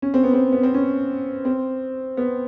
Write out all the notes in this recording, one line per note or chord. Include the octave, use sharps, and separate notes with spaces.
C#4
C4
B3
C4
B3
C4
C#4
C4
B3